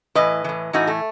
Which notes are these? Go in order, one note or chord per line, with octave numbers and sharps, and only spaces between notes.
A2 E3 B4 D#5
A2 E3
A2 E3 D#4 F#4
A3